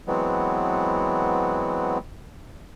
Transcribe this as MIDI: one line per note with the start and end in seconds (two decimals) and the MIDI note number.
0.08 1.98 52
0.08 1.98 54
0.08 1.98 56
0.08 1.98 59
0.08 1.98 60